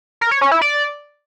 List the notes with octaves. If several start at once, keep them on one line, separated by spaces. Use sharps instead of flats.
A#4
C#5
C#4
E4
D5